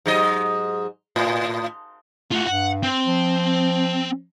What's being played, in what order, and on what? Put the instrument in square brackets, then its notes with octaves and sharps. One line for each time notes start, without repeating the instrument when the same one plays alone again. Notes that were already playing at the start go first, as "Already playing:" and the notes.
[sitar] G#2 F#3 D#5
A2
[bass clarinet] A3 [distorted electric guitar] F4 F#4
[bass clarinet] G2 [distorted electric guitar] F#5
[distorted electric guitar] C4
[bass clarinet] F3